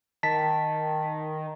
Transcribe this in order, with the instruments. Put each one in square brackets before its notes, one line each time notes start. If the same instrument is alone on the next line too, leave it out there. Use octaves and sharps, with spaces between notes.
[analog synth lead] D#3 [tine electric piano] A5 B6